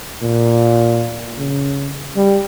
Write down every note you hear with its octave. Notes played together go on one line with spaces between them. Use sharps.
A#2
C#3
G3